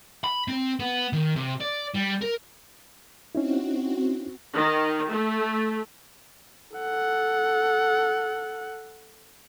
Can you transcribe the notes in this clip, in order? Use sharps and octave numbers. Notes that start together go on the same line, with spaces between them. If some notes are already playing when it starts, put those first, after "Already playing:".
B5
C4
B3
D#3
C3
D5
G3
A#4
C4 C#4 D#4 E4 F#4
D#3
A3
A4 F#5